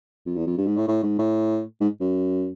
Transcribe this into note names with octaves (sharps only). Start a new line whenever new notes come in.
F2
E2
F2
G2
G#2
A2
A2
G#2
A2
G#2
F#2